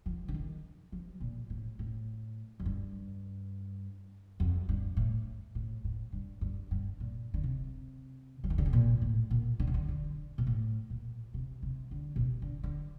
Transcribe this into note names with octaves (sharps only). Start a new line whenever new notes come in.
F3
D3
D#3
F3
A#2
A2
A2
F2
G2
F2
G2
A2
A2
A2
G2
G2
G2
A#2
D3
C3
F3
D#3
D3
C3
A#2
A2
A#2
D3
C3
D3
D3
A#2
A2
A#2
C3
C3
D3
A#2
C3
D3
D3